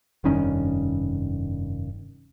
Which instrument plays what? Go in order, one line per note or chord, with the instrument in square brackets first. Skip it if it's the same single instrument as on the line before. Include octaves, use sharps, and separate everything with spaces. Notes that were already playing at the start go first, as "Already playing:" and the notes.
[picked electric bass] F1 G2 D#3 C#4